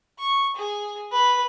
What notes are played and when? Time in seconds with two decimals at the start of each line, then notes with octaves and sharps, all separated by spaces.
0.19 C#6
0.56 G#4
1.12 B4